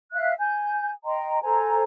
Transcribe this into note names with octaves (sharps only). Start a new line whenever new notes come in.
E5 F5 F#6
G#5 G6
D#5 G5 A#5 C6
A4 C5 G#5 A#5